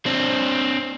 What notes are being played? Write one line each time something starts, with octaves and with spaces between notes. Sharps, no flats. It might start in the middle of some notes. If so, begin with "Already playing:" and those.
C4 D4